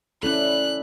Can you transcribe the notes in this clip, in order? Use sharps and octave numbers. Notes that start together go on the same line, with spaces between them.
C#4 E4 A4 B4 D5 F#6